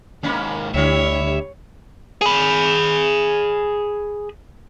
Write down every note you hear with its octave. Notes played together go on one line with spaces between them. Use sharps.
D#2 G#2 A#3 C#4 B5
D2 D3 G3 E4 C#5 E5
G#4 B5